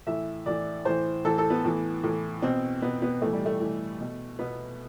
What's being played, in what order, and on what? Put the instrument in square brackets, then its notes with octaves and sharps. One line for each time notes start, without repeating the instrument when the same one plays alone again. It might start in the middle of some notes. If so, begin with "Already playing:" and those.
[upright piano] A2 E3 E5
A2 E3 D5
A2 E3 C5
A2 E3 A4
A4
B3
A2 E3
A2 E3
B2 C4
B2 B3
B3
A2 E3 A3
G3
A3
A2 E3
B2
B2 B3